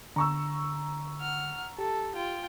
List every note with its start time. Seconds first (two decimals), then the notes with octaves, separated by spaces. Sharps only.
0.16 D3 A#5 C#6 E6
1.19 F#5 F6
1.78 G4 A4
2.14 F4 G5